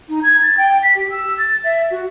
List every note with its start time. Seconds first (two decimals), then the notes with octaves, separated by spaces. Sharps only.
0.08 D#4
0.23 G#6
0.41 A6
0.57 G5
0.82 B6
0.95 G4
1.10 E6
1.38 A6
1.64 E5
1.91 F#4